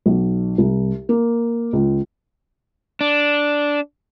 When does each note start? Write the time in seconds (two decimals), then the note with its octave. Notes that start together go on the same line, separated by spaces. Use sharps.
0.06 B1
0.58 C2
1.09 A#3
1.73 C#2
3.01 D4